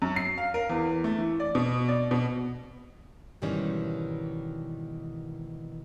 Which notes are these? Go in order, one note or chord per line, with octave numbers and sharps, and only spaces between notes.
F#2
C7
F5
A#4
E2
A3
E3
D5
B2
D5
B2
G#2 B2 D#3 E3 G3 C#4